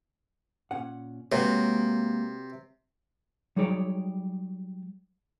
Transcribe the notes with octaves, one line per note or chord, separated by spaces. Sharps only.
A#2 C#4 F#5
C3 G#3 A#3 F#4 A4 B4 C#5
F#3 G3 D#4 G#4 C#5 D5